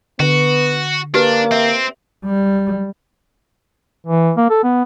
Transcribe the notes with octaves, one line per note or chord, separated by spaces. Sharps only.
D3 B3 F#4
A#3 D4 G4 B4
C4 E5
G3
E3
A#3
A4
B3